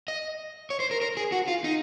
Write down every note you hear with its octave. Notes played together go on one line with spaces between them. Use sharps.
D#5
C#5
C5
A#4
A#4
G#4
F#4
F4
D#4